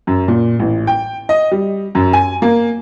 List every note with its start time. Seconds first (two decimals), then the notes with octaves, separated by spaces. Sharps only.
0.07 F#2
0.28 A#2
0.59 A1
0.87 G5
1.29 D#5
1.52 G3
1.95 F#2
2.13 G#5
2.42 A#3